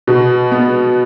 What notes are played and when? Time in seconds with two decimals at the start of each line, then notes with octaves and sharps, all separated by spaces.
0.07 B2
0.52 B3